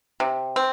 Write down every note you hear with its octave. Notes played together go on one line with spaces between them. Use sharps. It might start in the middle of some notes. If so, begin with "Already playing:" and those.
C3
C4